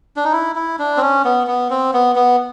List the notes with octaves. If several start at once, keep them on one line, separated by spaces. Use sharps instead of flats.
D4
D#4
E4
E4
D4
C4
C#4
B3
B3
C4
B3
B3